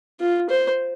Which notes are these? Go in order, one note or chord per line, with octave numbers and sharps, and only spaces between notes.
F4
C5